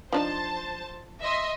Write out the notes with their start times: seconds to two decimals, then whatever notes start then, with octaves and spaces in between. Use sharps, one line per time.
0.13 F3 D4 D#4 C5 A5
1.23 D#5 E5 C6